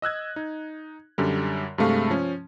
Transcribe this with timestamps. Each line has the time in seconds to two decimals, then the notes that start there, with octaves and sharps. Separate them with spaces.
0.02 D#5 E6 F#6 G#6
0.36 D#4
1.18 F#2 D3 G3
1.78 G2 C3 G#3 A3 F5 C#6
2.10 F3 C#4